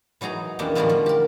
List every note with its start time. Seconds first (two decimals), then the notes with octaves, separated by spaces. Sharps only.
0.21 E3 F#3 D#4 G#4 A#5
0.59 E2 A#3 C#4 D4 G4
0.75 A2 D3 F3 G3 F#4 A#4
0.89 F3
1.06 G4 A#4